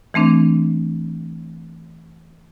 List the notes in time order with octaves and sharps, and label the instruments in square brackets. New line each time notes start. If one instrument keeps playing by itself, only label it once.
[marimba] E3 A3 C4 D4